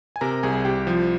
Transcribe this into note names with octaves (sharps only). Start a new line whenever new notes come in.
G#5
C3 A#4 A#5
C2 G#4 G#5
C2 G4 G5
F3